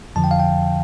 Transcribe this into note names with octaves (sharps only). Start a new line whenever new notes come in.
F2 D3 F3 A5
G5
F5
G5